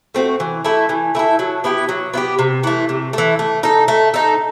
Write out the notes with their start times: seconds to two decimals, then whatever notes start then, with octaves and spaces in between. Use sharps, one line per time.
0.15 A3 C4 F#4
0.40 E3
0.65 A3 E4 A4
0.89 E3
1.15 A3 E4 A4
1.39 F#3
1.64 B3 E4 G4
1.89 F#3
2.14 B3 E4 G4
2.39 C3
2.64 E3 A3
2.89 C3
3.13 E3 A3
3.39 A3
3.63 D#4 A4
3.88 A3
4.14 D#4 A4